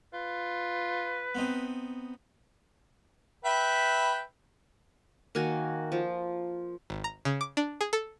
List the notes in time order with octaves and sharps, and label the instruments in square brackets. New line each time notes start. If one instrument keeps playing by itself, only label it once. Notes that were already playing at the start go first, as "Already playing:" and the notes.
[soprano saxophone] F4 [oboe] B4
[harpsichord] B3 C4 D#4
[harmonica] B4 E5 G5
[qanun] D#3 A#3 F#4 G#5
F3
[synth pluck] G#1
A#5
C#3
D6
D4
G#4
A4